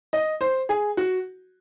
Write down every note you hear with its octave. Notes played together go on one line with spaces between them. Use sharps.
D#5
C5
G#4
F#4